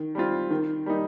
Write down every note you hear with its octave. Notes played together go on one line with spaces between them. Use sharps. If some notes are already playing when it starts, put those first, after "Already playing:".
Already playing: D#3
G3 C4 F4
D#3
G3 A#3 D#4